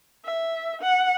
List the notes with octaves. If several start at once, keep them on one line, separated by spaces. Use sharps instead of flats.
E5
F#5